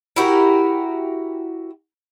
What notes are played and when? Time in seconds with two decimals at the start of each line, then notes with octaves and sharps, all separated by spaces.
0.16 E4 F#4 G4 A#4